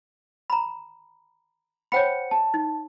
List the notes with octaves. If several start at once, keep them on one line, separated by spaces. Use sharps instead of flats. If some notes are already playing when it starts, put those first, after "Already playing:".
A#5 B5
C5 C#5 F#5 G5 B5 C#7
A5
D#4